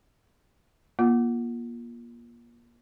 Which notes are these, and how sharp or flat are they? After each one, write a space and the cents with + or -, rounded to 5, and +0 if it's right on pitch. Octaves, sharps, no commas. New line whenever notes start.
A#3 +30 F4 +0